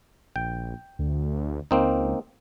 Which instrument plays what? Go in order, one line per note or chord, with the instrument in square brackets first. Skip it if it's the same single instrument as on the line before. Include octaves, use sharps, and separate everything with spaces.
[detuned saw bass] A#1 [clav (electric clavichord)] G5
[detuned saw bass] D2
[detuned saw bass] C#2 [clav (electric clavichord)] A#3 C4 D#4